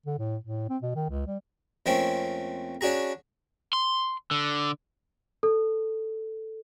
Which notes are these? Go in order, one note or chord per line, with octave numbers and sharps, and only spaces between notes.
D3
A2
A2
C4
B2
D#3
C#2
G3
F2 A3 A#3 C4 C#4
C#4 D4 F#4 G#4 A#5
C6
D3
A4